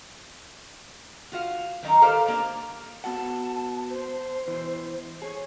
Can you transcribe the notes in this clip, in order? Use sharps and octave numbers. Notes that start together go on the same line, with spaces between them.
F4 F#4 F5
D#3 F#3 C#4 D#4 A#5
G4 A4 A#4 C5 F5
A#3 D4
B3 F#4 F#5 A5
C5
B2 E3
G#4 C#5